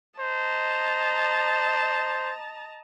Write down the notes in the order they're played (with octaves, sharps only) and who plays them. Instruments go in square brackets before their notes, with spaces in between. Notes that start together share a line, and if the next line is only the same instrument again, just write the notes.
[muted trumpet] C5 [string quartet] D#5 A5 A#5